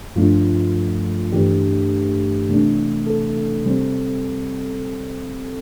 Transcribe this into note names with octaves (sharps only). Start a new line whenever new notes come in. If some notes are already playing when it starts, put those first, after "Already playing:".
G2 F3 A3 D4 F4
G2 E3 A3 D4 G4
C3 E3 A3 D4
A4
C3 G3 C4